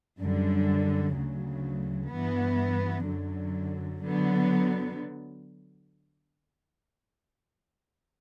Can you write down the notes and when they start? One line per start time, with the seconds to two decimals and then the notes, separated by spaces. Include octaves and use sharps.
0.19 F#2 D3 G3
1.14 D2 C#3 F#3
2.10 G2 E3 B3
3.05 F#2 D3 F#3
4.01 D3 F#3 B3